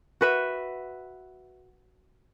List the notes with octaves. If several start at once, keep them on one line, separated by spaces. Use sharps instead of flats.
F#4 B4 E5